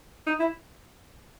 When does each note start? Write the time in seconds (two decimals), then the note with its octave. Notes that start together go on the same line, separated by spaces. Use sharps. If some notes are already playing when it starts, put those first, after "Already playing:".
0.27 D#4
0.39 E4